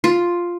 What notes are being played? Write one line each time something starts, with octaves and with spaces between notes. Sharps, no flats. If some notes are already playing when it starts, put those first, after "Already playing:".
F4